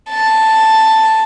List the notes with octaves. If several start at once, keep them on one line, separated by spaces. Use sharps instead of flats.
A5